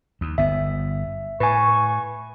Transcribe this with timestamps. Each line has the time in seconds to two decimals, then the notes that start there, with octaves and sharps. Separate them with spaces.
0.21 D#2
0.38 G1 B3 E5
1.40 A2 B4 G#5 C#6